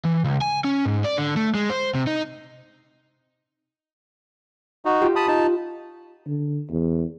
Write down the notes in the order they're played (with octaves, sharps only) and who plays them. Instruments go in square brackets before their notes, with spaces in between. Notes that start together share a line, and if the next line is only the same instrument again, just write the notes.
[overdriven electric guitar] E3
C#2
G#5
C#4
G#2
D5
D3
A3
G#3
C5
C3
D#4
[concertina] D#4 F#4
[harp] F4 G4
[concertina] A5 B5 D#6
D#4 A5
[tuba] D3
E2